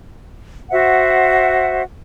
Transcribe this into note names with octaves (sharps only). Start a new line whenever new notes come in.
F#4 C5 E5 F#5